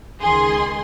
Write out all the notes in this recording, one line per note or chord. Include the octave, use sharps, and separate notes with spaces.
C#2 D#3 G#4 C6